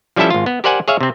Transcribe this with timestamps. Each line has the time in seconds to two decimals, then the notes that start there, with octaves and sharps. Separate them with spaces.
0.16 F3 G3 C#4 E4 A4 E5
0.30 G#1 F4
0.46 B3
0.64 G4 A#4 C5 D5 F#5 G#5
0.88 G#4 C#5 E5 F5
1.01 C3 C4